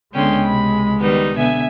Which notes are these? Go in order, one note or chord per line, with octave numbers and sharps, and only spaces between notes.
C#2 D3 G#3 B3 C#4 G5 C6
C3 B5
D#3 G3 B3 D#4
B2 D3 B3 E5 G#5